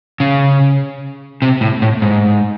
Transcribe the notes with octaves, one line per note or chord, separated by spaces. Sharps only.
C#3
C3
A2
A2
G#2